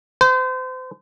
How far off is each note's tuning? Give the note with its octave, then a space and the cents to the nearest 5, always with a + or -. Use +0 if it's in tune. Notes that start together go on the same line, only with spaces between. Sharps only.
C5 -35